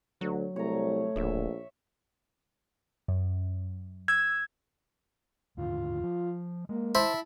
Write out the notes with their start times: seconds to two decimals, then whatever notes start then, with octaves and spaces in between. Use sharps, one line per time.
0.21 D2 F#3
0.56 C2 A3 C#5 A#5
1.16 D1 A#1 E5
3.08 F#2
4.08 E6 G#6
5.57 D#2 G#2 D3 F4
6.03 F3
6.69 G#3 A#3
6.95 E4 C5 A5